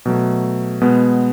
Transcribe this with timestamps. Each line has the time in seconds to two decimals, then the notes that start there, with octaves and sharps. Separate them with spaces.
0.06 B2 F#3 A3
0.81 B2 G#3 B3